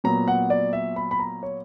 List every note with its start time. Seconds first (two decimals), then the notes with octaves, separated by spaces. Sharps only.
0.04 A#2 F#3 B3 A#5
0.28 F#5
0.50 D5
0.73 E5
0.96 B5
1.11 B5
1.20 A#5
1.43 C#5